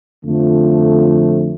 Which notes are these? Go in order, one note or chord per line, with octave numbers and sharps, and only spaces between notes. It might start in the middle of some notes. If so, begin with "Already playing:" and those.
F2 D3 F3 A3